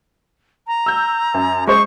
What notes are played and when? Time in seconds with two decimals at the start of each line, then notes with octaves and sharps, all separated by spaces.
0.67 A#5
0.86 E6 G6
1.34 F#2
1.67 G#3 C5 C#6